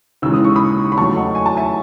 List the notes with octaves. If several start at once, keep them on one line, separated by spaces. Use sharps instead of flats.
D#2 C#3 E3 G#3 E6
D#6
C#6
B5 D#6
B5
E2 D#3 F#3 A3 A5 C#6
D#5 F#5
G#5
A5
E5 G#5